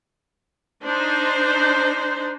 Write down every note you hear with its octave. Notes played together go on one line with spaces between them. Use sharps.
D4 D#4 C5